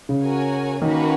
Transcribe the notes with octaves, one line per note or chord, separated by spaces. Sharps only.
C#3
F#4 A#4 C#5 G#5
D#3 A#3 C#4 F#4 B4